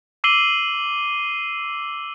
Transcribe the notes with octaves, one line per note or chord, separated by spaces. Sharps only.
D6 E6 C7 D#7 F#7 G7